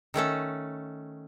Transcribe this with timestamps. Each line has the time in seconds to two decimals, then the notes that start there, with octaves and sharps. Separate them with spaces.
0.14 D#3 A3 C#4 A4